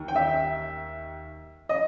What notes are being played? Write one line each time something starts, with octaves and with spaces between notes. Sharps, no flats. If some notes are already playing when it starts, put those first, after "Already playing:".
Already playing: D#2
G5
E5
D#5